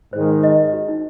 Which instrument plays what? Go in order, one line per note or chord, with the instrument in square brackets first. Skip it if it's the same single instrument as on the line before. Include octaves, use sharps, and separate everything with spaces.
[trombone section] G#2 D#3 G#3 [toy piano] C5
[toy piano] D#5
F#4
D#4